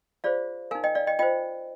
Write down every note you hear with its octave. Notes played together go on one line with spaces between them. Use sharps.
F4 G#4 C5 D5 F5
D#4 A#4 F5 G#5
D#5 G5
D5 F5
D#5 G5
F4 C5 D#5 G5